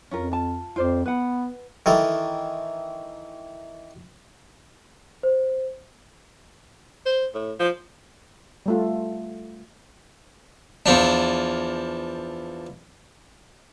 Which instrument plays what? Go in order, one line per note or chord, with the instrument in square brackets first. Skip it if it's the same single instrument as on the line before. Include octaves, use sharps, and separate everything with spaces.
[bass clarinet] F2 [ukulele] C#4 F4 A#4
[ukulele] F4 A5
[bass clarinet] F2 [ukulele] F4 C5 D5
[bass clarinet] B3 [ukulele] B4 F#5
[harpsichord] D#3 E3 A4
[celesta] C5
[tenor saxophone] C5
A2
F3
[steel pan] G3 A3 F4
[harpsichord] E2 F3 D4